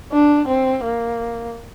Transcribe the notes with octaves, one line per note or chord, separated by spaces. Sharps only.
D4
C4
A#3